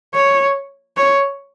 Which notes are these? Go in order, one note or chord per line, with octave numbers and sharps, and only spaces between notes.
C#5
C#5